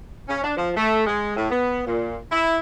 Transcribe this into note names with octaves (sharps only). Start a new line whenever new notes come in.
C#4
D4
F3
A3
G#3
A2
B3
A#2
E4